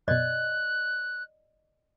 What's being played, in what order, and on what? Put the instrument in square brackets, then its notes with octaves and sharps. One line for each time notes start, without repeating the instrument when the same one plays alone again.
[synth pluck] F#2 B2 [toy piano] D5 D#5 [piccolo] F#6